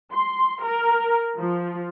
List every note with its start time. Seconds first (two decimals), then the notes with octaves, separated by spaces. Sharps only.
0.13 C6
0.65 A#4
1.39 F3